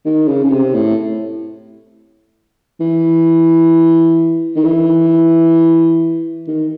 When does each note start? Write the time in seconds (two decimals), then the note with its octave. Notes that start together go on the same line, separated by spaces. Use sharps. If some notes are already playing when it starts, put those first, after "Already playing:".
0.05 D#3
0.28 C#3
0.44 C#3
0.51 C3
0.74 A2
2.80 E3
4.56 D#3
4.65 E3
6.47 D#3